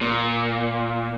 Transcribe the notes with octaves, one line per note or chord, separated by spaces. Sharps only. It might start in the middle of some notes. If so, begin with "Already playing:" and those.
A#2